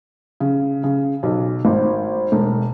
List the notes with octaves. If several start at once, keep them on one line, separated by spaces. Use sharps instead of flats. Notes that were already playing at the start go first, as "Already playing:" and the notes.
C#3
C#3
B1
G#1
E1